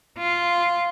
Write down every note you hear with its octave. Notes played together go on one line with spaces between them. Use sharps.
F4